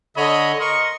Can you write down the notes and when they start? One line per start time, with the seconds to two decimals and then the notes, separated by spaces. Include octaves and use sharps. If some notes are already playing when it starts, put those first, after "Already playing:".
0.17 D3 C#5 D#5 B5
0.60 A#4 D#5 C6 C#6